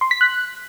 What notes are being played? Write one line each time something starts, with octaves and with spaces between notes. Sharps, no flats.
C6
B6
F#6